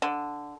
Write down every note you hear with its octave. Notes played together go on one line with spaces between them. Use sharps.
D3